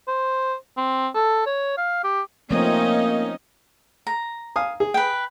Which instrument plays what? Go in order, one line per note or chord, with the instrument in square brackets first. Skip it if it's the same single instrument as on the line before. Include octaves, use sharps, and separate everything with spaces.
[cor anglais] C5
C4
A4
C#5
F5
G4
[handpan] F3 A3 C4 [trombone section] A#3 [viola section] C#4 D#4 D#5
[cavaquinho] A#5
[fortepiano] F5 G#5 D#6
G#4
[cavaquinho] B4 G5